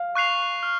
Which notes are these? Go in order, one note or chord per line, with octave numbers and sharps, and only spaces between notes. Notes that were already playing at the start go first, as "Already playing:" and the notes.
Already playing: F5
C#6 F#6 C7 F7
F6